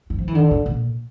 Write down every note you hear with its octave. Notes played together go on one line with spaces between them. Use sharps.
F#3
F3
E3
D3 D#3
A#2
A#2